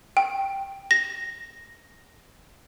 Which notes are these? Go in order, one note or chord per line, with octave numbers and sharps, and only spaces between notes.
G5
A#6